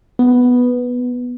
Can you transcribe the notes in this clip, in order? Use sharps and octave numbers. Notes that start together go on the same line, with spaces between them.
B3